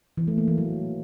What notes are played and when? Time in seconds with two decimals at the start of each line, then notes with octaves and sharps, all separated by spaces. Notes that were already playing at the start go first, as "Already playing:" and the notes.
0.17 E3
0.28 A3
0.38 A#3
0.48 E3
0.58 F#3